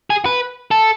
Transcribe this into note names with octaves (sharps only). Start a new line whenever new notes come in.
G#4
B4
A4